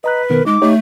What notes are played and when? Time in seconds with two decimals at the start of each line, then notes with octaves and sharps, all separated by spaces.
0.04 B4 D#5 A#5 F#6
0.30 B2 D#3 B3 A#4
0.46 G#3 D#4 D6
0.62 A3 D#4 G4 C#5